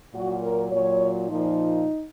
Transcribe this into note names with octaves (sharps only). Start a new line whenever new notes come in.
A#2 F#3 F#4
A#4
A#2 F#3 C#5
A#2 F3 D#4